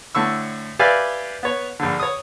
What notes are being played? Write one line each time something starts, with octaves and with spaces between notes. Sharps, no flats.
A2 D3 C#6 E6
G4 B4 D5 E5 F5 G#5
B3 C#5
A#1 D3
C#5 D#6